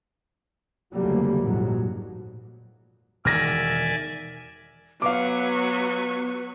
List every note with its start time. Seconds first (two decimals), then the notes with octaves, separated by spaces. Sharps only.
0.93 F1 D2 C#3 F#3 G3 A#3
1.41 A#1 F2 G#2 F3 F#3
3.25 E1 D#3 D5 E5 G#5 F6 A#6
5.02 F#3 B3 B4 F5 C#6 D6